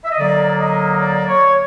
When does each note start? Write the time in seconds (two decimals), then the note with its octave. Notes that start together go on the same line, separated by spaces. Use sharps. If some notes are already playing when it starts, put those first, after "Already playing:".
0.05 E5
0.11 D#5
0.19 D3 F#3 A#3 D5
0.60 D#5
1.01 D5
1.28 C#5